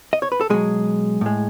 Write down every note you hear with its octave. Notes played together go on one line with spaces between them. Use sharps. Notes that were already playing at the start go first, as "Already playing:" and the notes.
D#5
C#5
B4
A4
B2 F#3 G#3 G#4
A2 G#3